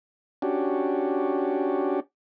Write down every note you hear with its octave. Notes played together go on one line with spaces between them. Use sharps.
C#4 D4 F#4 G4